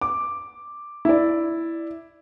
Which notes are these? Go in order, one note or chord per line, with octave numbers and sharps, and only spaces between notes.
D6
E4 D5